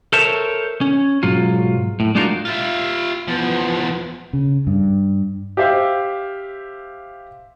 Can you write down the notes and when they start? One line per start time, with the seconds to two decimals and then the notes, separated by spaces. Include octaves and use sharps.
0.13 A4 A#4 C5 C#5 E5 A5
0.81 C#4
1.23 B1 G#2 F#3 F4
2.00 A2
2.15 G#3 D4 D#4 F4 F#4 A#4
2.45 F4 E5
3.28 E2 F3 B3
4.33 C#3
4.67 G2
5.57 G4 C5 E5 F5